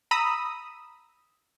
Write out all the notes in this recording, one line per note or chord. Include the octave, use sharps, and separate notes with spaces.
A#5 B5 D#6 E6